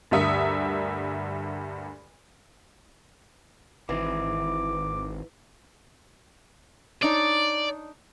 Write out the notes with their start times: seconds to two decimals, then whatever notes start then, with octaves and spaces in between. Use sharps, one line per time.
0.11 D2 G2 A#4 E5 D#6 C#7
3.89 G#1 D#3 E3 C4 D6
7.03 D4 D#4 C#5 D5